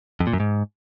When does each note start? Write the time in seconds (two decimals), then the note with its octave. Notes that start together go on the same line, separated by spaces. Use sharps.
0.20 F2
0.27 A#2
0.33 F#2
0.40 G#2